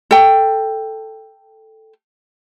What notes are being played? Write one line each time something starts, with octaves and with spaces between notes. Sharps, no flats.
A4 G5